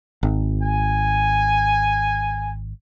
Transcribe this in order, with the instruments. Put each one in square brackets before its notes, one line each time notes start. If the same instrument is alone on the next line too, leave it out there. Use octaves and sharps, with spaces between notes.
[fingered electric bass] G#1
[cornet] G#5